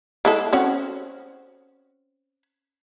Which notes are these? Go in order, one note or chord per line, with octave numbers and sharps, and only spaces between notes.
G#3 E4 A4
C4 C#4 F#4